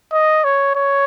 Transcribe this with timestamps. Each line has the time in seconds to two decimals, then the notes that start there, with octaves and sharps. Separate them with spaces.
0.12 D#5
0.44 C#5
0.76 C#5